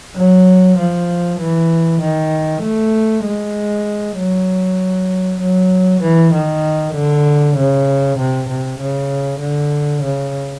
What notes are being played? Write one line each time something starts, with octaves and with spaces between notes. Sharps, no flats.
F#3
F3
E3
D#3
A3
G#3
F#3
F#3
E3
D#3
D3
C#3
C3
C3
C#3
D3
C#3